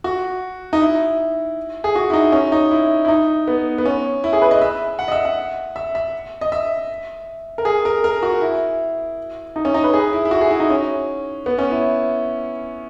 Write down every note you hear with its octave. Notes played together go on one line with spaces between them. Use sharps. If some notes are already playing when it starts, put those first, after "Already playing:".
F#4
D#4
E4
G#4
F#4
E4
D#4
C#4
D#4
E4
E4
D#4
B3
B3
C#4
E4
G#4
B4
D#5
E5
F#5
D#5
E5
F#5
E5
E5
D#5
E5
A#4
G#4
A#4
A#4
F#4
E4
D#4
C#4
D#4
B4
G#4
E4
E4
F#4
G#4
E4
D#4
C#4
B3
C#4
E4